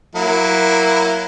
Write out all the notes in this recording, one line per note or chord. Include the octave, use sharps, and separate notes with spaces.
F#3 A#3 E4